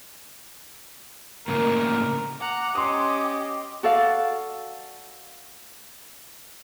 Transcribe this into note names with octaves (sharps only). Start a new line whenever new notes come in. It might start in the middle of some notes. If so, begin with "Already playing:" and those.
A2 C#3 A#3 A#4
F#5 A#5 D6
C#4 G4 D#5 C6 D#6
F#4 A4 D5 F5